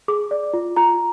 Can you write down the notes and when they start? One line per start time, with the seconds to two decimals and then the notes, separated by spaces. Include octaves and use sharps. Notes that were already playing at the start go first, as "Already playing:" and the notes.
0.08 G#4 D6
0.31 D5
0.53 F4
0.76 F4 A#5